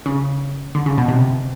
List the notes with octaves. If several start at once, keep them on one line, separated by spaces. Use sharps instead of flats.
C#3
D3
C#3
B2
C3